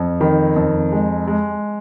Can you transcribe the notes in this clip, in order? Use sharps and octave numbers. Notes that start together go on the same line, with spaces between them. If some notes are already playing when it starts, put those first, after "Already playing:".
Already playing: F2
D#3 B5
F2
G#3
G#3